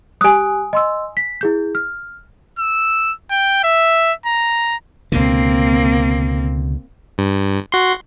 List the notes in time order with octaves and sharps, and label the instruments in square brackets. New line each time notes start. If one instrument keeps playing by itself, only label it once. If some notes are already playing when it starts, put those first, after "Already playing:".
[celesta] G4 F#6 [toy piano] G#5 D#6
[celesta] D#5 C6 E6
B6
E4 G#4 G6
F6
[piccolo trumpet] E6
G5
E5
A#5
[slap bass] C#2 B2 D3 [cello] A#3 C4
[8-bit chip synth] G2
F#4 C6